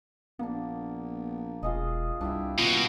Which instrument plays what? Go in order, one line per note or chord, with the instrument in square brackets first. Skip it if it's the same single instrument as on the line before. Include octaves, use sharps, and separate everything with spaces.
[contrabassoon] A#1 [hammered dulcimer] A#3 D4 [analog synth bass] B3
[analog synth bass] E1 [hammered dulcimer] F4 G#4 D#5
[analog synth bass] C2 [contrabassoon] G2 [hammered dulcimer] D4 E4 G4
[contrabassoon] D#1 [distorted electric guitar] B2 [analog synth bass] F4